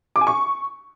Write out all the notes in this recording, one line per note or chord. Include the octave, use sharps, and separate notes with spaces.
D6
G#5
C#6